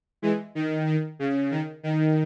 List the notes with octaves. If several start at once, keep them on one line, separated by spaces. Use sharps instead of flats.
E3 G#3
D#3
D#3
C#3
D#3
D#3